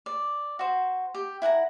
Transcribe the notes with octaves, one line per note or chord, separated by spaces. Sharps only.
D5
F#4 C5
G4
E4 F#5 G#5 A#5